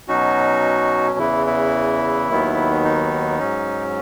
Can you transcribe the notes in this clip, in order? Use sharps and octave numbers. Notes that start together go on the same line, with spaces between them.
B2 F#3 C#4 D#4 F#4
E2 C#3 E3 E4
E4
D#2 D#3 F#3 B3
D#4
G#2 F#3 C#4